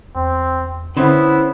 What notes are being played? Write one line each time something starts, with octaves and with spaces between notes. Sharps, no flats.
E2 C4
D3 B3 C#4 E4 C5 C#5